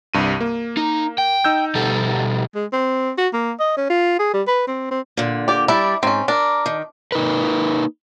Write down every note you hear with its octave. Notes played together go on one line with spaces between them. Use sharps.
C2 G2 D#7
A#3
D#4
G5
D#4 E6 G6
B2 G3 A4
G#3
C4
F#4
A#3
D#5
C#4
F4
G#4
G3
B4
C4
C4
A#2 D3
G4 D5
G3 D4 E4 D5
G#2 C4 C#4
D4 A#4
D#3
A#3 D#4 A#4 B4